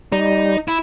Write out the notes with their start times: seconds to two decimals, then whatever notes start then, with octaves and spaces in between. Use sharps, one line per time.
0.12 G3 D#4
0.68 E4